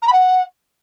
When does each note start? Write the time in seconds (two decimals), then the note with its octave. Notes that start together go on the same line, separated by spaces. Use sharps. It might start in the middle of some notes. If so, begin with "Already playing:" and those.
0.02 A#5
0.07 B5
0.13 F#5